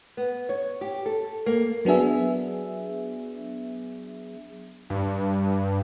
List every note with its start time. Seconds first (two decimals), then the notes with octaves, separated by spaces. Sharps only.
0.17 B3
0.49 C#5
0.81 G4
1.06 A4
1.46 A#3
1.85 F#3 B3 D4 G#4 E5
4.90 G2